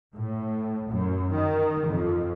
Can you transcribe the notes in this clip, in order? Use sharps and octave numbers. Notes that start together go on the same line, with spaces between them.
A2
F#2
D#3
F2